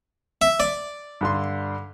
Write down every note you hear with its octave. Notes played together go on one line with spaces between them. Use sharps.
E5
D5
G2 D3 C6